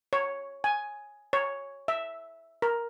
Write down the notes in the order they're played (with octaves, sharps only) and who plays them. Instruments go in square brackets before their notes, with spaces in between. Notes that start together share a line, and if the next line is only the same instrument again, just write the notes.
[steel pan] C#5
G#5
C#5
E5
A#4